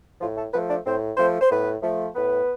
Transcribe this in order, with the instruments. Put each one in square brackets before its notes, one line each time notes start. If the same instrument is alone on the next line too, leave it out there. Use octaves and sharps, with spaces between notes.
[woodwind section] A2 F3 F4
A3 A4
F3 A3 B3 B4
D4 D5
A2 C4 C5
F3 A3 C4 C5
C5
A2 B3 B4
F3 A3
A2 B3 B4